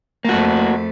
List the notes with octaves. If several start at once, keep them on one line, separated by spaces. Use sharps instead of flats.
F2 A3 A#3 F#4